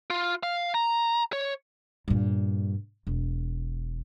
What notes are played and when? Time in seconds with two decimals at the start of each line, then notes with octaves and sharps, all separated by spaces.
0.10 F4
0.43 F5
0.75 A#5
1.33 C#5
2.08 G2 A#2
3.07 E1